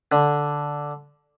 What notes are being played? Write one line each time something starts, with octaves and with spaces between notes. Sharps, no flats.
D3